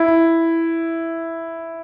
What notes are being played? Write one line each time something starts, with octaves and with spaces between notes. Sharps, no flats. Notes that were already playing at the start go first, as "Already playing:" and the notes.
Already playing: E4